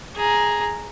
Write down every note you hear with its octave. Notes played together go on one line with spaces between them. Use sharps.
G#4 A#5